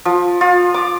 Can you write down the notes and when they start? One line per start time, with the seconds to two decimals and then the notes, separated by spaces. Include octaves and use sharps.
0.05 F3
0.41 F4
0.74 D6